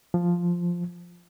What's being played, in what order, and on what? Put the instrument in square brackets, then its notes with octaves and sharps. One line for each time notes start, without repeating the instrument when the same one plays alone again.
[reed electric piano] F3